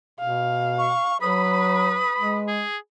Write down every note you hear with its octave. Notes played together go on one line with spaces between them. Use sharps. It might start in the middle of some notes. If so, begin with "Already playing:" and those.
B2 F5
C#6
F#3 B4 B5 D#6
G#3
G#4